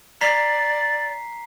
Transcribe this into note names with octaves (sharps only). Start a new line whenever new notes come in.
D5 A#5 B6 C7